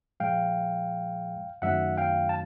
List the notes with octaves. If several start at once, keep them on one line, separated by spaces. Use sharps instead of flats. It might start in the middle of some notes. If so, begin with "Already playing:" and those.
A#2 F3 G#3 F5 G5
F#2 D#3 F#3 A3 E5 F#5
F5 G5
A5